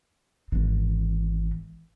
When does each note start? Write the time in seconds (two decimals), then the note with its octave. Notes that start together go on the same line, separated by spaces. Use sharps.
0.52 G#1 E3